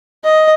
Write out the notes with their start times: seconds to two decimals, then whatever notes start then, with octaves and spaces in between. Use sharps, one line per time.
0.24 D#5